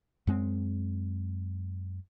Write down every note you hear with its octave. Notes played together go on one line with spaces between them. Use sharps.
F#2 G#3 C4